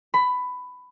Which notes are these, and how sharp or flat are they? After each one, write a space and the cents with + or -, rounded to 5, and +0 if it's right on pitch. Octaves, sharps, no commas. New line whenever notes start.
B5 +15